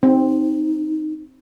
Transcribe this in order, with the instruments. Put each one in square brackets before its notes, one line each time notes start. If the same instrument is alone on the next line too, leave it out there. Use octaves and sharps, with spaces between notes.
[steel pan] C4 [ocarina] D#4